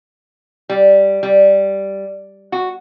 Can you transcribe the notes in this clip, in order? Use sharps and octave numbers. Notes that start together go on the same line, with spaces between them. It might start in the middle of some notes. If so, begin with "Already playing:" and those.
G3
G3
F#4